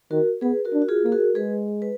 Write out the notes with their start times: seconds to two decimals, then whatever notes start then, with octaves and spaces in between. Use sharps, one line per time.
0.11 D#3 F#4 A#4
0.41 B3 G#4 B4
0.65 F#4 A#4
0.73 D4
0.82 F#4
0.88 F4 G#4
1.04 A#3 G#4
1.12 F#4 A#4
1.35 G#3 G#4 B4
1.82 B4